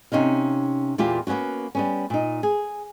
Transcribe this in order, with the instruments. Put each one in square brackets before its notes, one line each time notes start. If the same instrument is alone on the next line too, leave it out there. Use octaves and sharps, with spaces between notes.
[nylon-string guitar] C3 C#4 D#4 F5
E2 A#2 F4 G4
A#3 B3 C#4 F4 F#4
G3 B3 C#4
A#2 D#4
G#4